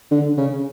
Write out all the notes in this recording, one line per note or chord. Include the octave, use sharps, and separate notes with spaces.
D3
C#3